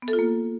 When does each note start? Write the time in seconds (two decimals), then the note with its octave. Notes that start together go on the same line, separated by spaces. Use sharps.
0.02 B3
0.08 A4
0.13 F4
0.19 A#3